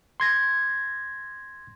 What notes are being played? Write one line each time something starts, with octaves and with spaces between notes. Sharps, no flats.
C6 G#6 A#6